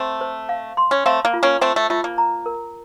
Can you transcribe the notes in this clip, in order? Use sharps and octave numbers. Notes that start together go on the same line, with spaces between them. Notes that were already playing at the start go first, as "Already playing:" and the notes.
Already playing: A3 C4
C5
F5
C6
C#4
A3 C4 F5
A#3
F4
A#3 C#4
A3 C4 C5
A3
A3 F4
A#3
A#5
A#4